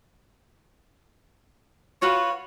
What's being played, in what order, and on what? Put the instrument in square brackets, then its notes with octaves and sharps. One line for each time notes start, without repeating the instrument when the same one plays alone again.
[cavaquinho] F4 F#4 B4 [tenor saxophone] C#5